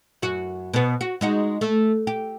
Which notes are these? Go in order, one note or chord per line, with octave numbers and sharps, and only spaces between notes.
F#2 F#4
B2 B3
F#4
G#3 D#4 F#4
A3
G4